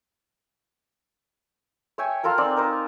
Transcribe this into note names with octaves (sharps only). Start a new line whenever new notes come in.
C#5 E5 G5 G#5
F4 A4 A#4 A#5
C4 D#4 D5 G#5
D#4 A#4 C5